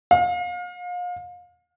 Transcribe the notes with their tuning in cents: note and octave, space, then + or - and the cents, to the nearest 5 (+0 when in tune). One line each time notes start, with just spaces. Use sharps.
F5 +35